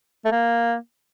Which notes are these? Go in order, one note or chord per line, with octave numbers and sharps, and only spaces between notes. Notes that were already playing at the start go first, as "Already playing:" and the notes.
A3
A#3